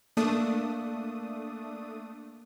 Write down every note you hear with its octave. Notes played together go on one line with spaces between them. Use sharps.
A3 A#3 D4 D#6